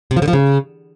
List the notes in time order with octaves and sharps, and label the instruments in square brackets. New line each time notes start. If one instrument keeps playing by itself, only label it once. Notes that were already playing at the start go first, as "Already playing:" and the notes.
[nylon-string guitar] C3
F3
D3
F3
C#3